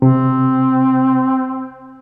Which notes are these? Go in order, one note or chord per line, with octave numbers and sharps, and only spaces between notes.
C3 C4